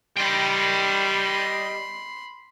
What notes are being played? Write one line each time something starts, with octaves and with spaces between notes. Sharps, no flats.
G3 D#5 G5 B5 C6